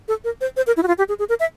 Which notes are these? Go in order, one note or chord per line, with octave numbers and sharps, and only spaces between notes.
A4
A#4
C5
C5
A#4
E4
F#4
F4
G4
G#4
G#4
A#4
E5